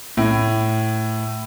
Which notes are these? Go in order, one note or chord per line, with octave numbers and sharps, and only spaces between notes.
A2